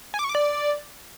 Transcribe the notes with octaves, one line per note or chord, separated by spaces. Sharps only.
G#5
D6
C#6
D6
D5